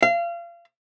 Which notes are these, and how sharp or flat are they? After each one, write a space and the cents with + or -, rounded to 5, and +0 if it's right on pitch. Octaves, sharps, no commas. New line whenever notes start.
F5 -30